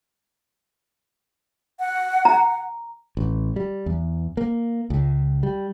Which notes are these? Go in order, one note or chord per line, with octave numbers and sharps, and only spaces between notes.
F#5
A#5
A1
G3
E2
A#3
C#2
G3